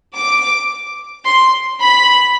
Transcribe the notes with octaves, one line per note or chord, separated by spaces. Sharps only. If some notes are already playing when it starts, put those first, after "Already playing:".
D6
C6
B5